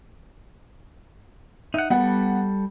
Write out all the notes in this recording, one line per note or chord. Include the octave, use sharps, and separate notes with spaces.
D#4 E5 F#5
G3 B3 A4 F#5